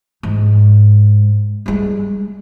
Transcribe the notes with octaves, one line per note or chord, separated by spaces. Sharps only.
G#2
G3 G#3